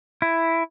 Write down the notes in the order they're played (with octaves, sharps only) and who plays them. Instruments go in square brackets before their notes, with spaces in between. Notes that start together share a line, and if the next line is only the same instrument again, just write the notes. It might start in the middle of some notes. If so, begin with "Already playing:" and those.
[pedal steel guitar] E4